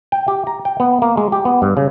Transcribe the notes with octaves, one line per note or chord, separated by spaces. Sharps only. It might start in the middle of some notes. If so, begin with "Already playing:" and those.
G5
G4
A#5
G5
B3
A#3
G#3
G4
B3
G2
C#3